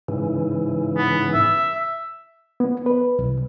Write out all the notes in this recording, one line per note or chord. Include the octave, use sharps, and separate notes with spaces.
G#2 C#3 E3
B3
E5
B3
B4
C2